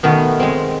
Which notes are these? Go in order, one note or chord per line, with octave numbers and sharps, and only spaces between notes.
B2 D#3 A3 B3
G#3 C4